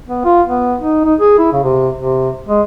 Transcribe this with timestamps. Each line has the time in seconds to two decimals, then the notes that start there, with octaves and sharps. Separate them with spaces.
0.08 B3
0.24 F4
0.47 B3
0.79 D#4
1.05 D#4
1.19 G#4
1.38 E4
1.53 C#3
1.64 C3
1.97 C3
2.49 G#3